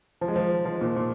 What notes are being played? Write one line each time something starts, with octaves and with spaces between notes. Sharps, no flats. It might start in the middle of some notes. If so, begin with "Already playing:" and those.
F3
G#3
F3
F3
A#2
A#2